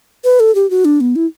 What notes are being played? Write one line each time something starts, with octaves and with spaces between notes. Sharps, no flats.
B4
A4
G4
F#4
D4
B3
E4